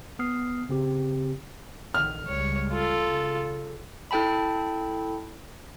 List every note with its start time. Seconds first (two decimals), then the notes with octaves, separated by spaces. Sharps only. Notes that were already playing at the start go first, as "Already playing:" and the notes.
0.19 B3 D#6 F6 C7
0.69 C#3 C4 G4
1.94 A#1 D3 D#3 F6
2.27 C#2 G3 C#5
2.72 F4 A4
3.05 C#3
4.11 E4 A4 G5 A5 B5